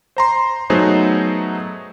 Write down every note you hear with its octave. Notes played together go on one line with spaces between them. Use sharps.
C5 A#5 C6
F#3 A3 B3 D#4 G#4 C5